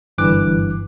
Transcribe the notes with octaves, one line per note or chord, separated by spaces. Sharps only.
G1 G2 E3 D6 F#6